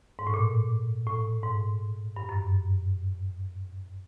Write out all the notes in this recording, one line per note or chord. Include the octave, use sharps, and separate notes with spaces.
G#2
A2
A#2
A2
G#2
G2
F#2